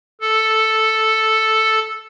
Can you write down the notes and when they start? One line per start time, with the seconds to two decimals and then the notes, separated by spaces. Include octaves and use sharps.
0.21 A4